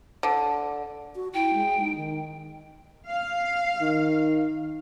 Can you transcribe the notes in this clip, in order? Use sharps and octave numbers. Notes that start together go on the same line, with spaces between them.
D3
F#4
E4 G5
G#3
D#4
D#3
F5
D#3